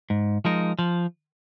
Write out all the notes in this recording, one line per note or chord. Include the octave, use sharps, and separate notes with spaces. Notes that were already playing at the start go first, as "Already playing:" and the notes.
G#2
F3 G#3 D#4 A#4
F3